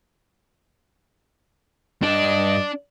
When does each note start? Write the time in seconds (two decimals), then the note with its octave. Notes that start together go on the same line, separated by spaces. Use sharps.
2.03 G2 D4 D5 D#5